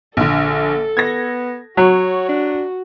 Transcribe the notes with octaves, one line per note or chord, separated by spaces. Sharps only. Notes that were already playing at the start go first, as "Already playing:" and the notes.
A#1 D3 A4
B3 G#6 A#6
F#3 F#4 C#5
D4